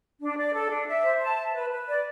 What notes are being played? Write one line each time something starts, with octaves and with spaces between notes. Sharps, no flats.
D4
D5
A4
D4
E5
C5
A5
E5
B4
B4
D5